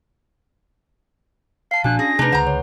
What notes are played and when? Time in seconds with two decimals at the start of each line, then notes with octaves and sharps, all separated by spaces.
1.71 F5 A5 C7
1.84 A#2 F3 D4 F#4 G#5 F#6
1.99 C#4 G#4 A#6
2.19 C3 A3 D4 D#4 G#4 B4
2.32 C#2 D3 C5 F#5 A#5
2.47 C#5